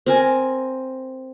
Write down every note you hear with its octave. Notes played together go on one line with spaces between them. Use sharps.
C4 A#4 G#5